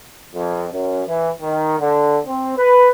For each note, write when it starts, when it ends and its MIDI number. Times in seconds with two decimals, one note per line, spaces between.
0.33 0.66 41
0.71 1.01 42
1.06 1.29 52
1.40 1.77 51
1.79 2.18 50
2.26 2.55 60
2.57 2.88 71